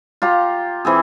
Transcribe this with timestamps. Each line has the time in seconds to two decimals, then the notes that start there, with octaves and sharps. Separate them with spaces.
0.22 F4 G4 A#5
0.85 E3 C4 G#4